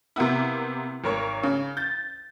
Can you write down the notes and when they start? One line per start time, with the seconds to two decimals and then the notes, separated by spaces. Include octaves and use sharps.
0.16 C3 A#3 B3 E4
1.04 G#1 A#4 C#5
1.43 C#3
1.77 G6 A6